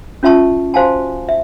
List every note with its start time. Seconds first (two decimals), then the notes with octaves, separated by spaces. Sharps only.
0.23 C#4 F4 E5 A5 C#6
0.74 F#4 C5 F5 G#5 A5
1.29 E5